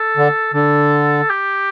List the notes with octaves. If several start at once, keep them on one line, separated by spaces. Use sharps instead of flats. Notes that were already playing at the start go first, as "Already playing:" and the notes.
Already playing: A4
D3
D3 A4
G4